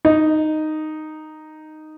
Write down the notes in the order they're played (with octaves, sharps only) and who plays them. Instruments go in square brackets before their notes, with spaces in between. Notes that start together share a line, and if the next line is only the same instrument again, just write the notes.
[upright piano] D#4